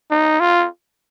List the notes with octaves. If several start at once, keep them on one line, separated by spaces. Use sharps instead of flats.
D#4
F4